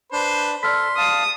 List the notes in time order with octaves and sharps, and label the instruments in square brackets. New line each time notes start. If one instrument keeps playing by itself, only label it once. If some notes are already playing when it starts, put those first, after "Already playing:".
[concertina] D4 [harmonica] B4 C5
[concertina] A4 [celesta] D5 F6 B6 [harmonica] C6
[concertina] F5 A5 [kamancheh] D#6